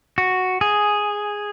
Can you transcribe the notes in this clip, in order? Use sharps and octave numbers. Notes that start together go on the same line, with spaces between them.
F#4
G#4